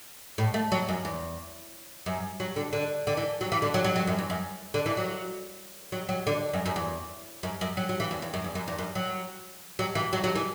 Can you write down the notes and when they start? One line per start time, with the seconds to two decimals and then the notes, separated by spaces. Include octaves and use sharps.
0.38 A2
0.54 A3
0.72 F#3
0.88 F#2
1.05 E2
2.06 F#2
2.40 F#3
2.56 D3
2.73 D3
3.07 D3
3.17 E3
3.41 F#3
3.52 E3
3.62 D3
3.74 F#3
3.84 F#3
3.96 F#3
4.07 F#2
4.19 E2
4.30 F#2
4.74 D3
4.86 E3
4.97 F#3
5.92 F#3
6.09 F#3
6.27 D3
6.53 F#2
6.66 F#2
6.76 E2
7.43 F#2
7.61 F#2
7.77 F#3
7.89 F#3
8.00 E3
8.11 E2
8.22 E2
8.34 F#2
8.44 E2
8.55 F#2
8.68 E2
8.78 F#2
8.95 F#3
9.79 F#3
9.95 E3
10.13 F#3
10.24 F#3
10.36 E3